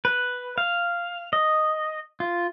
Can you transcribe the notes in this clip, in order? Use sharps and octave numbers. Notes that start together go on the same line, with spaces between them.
B4
F5
D#5
F4